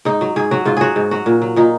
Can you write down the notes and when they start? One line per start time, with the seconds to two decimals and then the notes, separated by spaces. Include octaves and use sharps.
0.05 G#2 D#4
0.21 F#3
0.36 G#2 G#4
0.51 F#3 F#4
0.65 G#2 F4
0.77 F#3 F#4 G#4
0.96 G#2
1.11 F#3 F#4
1.26 A#2
1.42 F#3
1.56 A#2 D#4